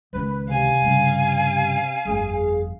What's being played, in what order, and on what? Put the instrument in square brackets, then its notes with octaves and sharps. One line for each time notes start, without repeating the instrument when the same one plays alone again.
[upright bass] C#2 D#3 [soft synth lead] B4
[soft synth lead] C3 [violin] F5 [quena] G#5
[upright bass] G2 C#3
[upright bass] G1 F2 [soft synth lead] G#4